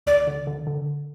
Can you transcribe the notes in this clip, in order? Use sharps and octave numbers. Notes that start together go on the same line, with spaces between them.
D2 D5
D3
D3
D3